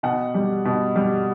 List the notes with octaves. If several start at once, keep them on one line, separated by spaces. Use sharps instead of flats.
B2 F#5
G3
B2
G3